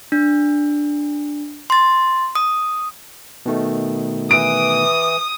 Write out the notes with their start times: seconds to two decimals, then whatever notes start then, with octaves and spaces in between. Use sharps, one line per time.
0.12 D4
1.70 C6 A6
2.35 D#6
3.46 B2 D#3 A3
4.31 E3 D#6 D7